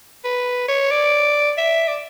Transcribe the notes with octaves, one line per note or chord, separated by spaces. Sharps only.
B4
C#5
D5
E5
D5